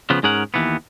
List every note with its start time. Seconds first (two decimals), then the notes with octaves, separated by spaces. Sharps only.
0.10 C#3 F3 B3
0.23 G#2 C#4 G#4 A#4 F#5
0.54 D#2 E3 B3